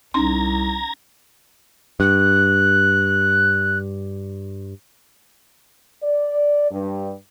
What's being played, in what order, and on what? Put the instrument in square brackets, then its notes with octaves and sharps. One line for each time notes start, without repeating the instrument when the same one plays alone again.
[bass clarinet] C2 [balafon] C#4 D#4 C6 [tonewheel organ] A#5 G#6 A#6
[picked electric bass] G2 [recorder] F#6
[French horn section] D5
G2